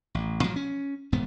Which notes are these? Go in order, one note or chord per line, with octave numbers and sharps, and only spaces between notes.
A1
A#2 F3 F#3 G#3
C#4
D#1 D2 G#2 B3